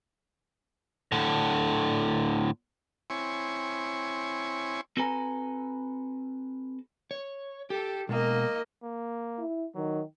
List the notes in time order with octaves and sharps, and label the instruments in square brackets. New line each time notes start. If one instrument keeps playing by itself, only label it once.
[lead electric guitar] A2 D3
[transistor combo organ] C4 E4 C#5 G#5
[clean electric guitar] C4 F#4 A4 B4 G#5 A#5
[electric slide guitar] C#5
[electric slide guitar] G4 [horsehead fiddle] A4
[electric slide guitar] B2 G#3 [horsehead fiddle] A#3 D#5
[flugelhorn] A#3
[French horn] E4
[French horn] D#3 [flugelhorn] F#3